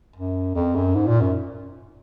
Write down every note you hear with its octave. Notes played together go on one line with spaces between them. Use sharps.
F#2
F2
F#2
G#2
A#2
F#2